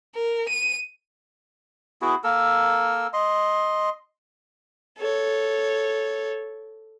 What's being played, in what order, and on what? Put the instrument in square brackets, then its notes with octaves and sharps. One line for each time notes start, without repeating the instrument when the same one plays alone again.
[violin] A#4
D#7
[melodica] B3 E4 F#4 G#4
A#3 A4 A#4 E6
D#5 C6
[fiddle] A4 C#5